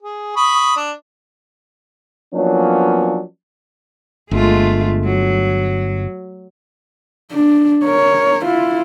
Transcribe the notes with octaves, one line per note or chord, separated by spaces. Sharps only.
G#4
B5 C#6 D#6
D4
F3 F#3 A#3 B3 C#4 D4
G1 G#3 A3 F4
F#3
D4
A#4 C#5
E4 F4